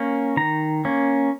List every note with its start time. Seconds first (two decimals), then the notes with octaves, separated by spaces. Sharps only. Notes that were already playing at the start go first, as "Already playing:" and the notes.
Already playing: A#3 C#4
0.37 D#3 A#5
0.85 A#3 C#4